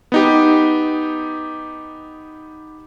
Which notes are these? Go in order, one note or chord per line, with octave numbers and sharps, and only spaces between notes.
B3 D#4 G4